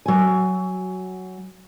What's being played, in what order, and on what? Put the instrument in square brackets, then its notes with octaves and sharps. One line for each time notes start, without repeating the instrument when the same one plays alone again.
[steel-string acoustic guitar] F#3 G#5